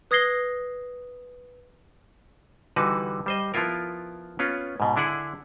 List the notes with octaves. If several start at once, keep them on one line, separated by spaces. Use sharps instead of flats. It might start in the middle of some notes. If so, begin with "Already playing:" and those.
B4 D#6 G#6 A#6 C7 G7
D3 E3 G3 D#4 F#4 B4
G3 C5 D#5
F3 B3 E4 F4 A#4
B3 C#4 F4
G#2 B2
D3 D4 E4 G#4 F#5